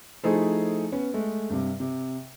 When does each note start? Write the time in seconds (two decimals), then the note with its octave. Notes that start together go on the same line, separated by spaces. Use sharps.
0.23 F3 A3 D#4 E4 G#4 C5
0.92 B3 C#4
1.14 G#3 A3
1.50 G2 C3
1.80 C3